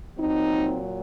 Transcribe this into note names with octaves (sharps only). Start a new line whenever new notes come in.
A#2 F#3 C4 D#4